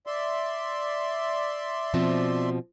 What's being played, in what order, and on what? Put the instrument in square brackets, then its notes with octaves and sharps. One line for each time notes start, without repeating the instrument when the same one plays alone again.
[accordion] D5 E5 C6
[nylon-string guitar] B2 F3 C4